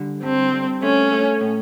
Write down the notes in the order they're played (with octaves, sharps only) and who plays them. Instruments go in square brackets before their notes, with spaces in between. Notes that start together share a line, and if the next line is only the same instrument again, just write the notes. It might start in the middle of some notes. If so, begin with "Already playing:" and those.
Already playing: [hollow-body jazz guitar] D3 G3
[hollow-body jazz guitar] G2 [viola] C4
[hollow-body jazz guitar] G2
[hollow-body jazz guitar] A3 [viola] C#4
[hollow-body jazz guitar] A3
A2